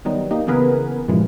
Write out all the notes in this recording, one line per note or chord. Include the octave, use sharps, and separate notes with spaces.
D#3 F#3 G3 B3 D#4
A#3 D#4 G4
C#3 E3 B3 G#4 A#4 B4
G2 A#2 C#3 E3 F3 G#3